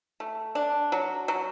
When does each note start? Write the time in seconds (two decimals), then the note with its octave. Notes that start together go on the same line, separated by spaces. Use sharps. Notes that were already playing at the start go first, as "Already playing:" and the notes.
0.20 A3
0.55 D4
0.92 F#3
1.28 F#3